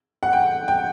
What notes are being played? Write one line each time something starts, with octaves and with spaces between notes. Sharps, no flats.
F#5
G5
G5